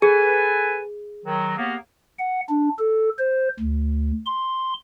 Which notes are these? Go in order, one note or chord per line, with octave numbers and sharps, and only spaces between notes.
G#4 A4 B4 G#5
D#3 F#3
D#2 A#3 B3
F#5
D4
A4
C5
D2
C6